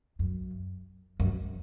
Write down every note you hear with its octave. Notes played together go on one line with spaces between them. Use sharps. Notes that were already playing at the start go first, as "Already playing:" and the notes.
F#2
F#2